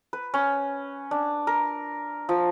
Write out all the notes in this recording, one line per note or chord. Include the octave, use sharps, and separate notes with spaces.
B4
C#4
D4
A#4
F3